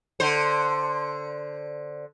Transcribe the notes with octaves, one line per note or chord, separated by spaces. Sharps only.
D3 C5